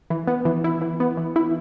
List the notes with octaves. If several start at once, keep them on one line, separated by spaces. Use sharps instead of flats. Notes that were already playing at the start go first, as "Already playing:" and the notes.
E3
B3
E3
E4
E3
B3
E3
E4